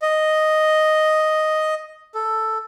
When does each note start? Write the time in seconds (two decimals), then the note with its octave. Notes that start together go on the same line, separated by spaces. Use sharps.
0.02 D#5
2.15 A4